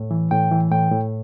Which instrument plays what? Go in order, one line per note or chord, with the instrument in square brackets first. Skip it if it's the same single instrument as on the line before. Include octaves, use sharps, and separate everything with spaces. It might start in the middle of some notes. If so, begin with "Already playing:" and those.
Already playing: [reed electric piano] A2
E3
A2 G5
E3
A2 G5
A2